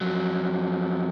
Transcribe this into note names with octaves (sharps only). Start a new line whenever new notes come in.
F2 F#3